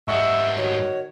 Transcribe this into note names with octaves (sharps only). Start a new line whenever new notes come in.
G#2 G3 D#5 E5 F#5 C#6
D#3 F#4 C#5